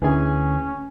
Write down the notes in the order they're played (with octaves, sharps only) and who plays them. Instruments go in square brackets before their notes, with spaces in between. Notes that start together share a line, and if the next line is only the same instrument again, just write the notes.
[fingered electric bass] D2 [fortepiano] E3 G#4 G#5 [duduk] C#4